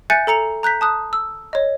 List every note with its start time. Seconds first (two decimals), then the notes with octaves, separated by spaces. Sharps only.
0.10 E5 G#5 F#6 G6 A6 C#7
0.27 A4 A#5 C#7 F7
0.63 A#5 F#6 G6 B6
0.81 A5 D#6 F#6
1.13 E6
1.53 C#5 D#5